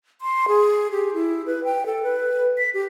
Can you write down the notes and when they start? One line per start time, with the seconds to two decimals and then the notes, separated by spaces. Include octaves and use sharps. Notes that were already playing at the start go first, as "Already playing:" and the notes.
0.21 C6
0.48 G#4
0.91 G4
1.14 E4
1.46 B4
1.64 G5
1.86 A4
2.03 B4
2.58 B6
2.74 G4